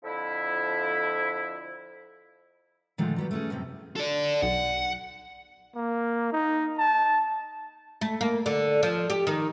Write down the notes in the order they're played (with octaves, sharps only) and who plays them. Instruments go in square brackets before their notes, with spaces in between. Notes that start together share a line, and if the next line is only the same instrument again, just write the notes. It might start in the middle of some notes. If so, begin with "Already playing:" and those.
[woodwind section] F2 D3 F3 E4
[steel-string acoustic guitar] A#2 D3 D#3 F3 G#3 A3
F#3 G3 B3
A3 C#4 G#4
F#2 A2 C3 C4
[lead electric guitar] A4 D5
[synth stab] B1 [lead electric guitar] F#5
[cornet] A#3
D#4
A5
[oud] A3
A#3
D3
F3
G4
D#3